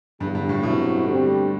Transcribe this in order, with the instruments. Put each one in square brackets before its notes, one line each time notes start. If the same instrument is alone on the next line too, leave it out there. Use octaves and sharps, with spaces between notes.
[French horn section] E2 D3 G3 [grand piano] G2
[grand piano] G2
A2
[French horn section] G2 F#3 A3 C4 E4 [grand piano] B2
[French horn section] D3 G3 C4